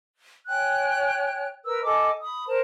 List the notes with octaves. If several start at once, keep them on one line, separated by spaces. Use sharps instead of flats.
C#5 G5 G#5 F#6
A#4 B4 E6
A4 D#5 G#5 D6
B5 D#6
A#4 C5 A5